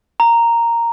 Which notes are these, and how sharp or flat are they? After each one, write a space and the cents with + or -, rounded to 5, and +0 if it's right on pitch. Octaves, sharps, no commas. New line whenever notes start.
A#5 -5